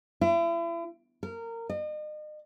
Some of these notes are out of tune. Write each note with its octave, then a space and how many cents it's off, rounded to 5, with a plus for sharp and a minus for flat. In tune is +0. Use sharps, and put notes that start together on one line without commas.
E4 +40
A#4 -20
D#5 -40